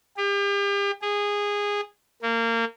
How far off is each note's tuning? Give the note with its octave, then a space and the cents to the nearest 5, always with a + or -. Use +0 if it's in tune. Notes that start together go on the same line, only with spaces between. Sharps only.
G4 +40
G#4 -15
A#3 -25